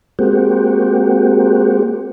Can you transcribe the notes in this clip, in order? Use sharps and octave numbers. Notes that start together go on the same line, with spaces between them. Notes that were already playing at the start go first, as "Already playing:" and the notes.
G#3 A#3 C4 F#4 G4